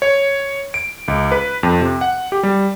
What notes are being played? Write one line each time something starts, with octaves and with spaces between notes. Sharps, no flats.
C#5
D7
C#2
B4
F2
C3
F#5
G4
G3